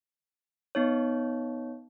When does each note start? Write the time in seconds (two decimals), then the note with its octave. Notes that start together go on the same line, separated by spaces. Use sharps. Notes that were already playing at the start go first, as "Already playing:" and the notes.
0.75 B3 D#4 C#5